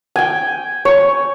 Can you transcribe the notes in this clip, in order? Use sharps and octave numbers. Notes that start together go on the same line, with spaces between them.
G5 G#5
C#5